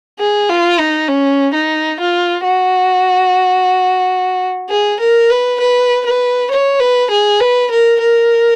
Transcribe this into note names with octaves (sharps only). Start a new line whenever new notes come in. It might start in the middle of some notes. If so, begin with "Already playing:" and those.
G#4
F4
D#4
C#4
D#4
F4
F#4
G#4
A#4
B4
B4
B4
C#5
B4
G#4
B4
A#4
A#4